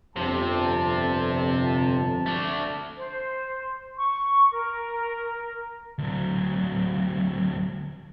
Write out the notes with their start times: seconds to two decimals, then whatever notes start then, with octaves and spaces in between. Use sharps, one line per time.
0.16 G1 F2 C3 A5
2.26 A3 D4
2.97 C5
3.98 C#6
4.52 A#4
5.98 D2 F#3